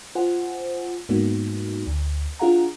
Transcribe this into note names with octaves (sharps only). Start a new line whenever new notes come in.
F4 C5 F#5 G#5
G#2 G#3 A#3 B3 D#4 F#4
D2
D4 F4 G#4 F5 F#5 A#5